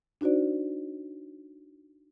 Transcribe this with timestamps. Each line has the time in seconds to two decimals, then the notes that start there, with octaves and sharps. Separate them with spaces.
0.21 D4 D#4 F#4 C5 D5